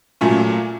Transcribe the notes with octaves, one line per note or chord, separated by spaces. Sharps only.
A#2 F#3 A3 C#4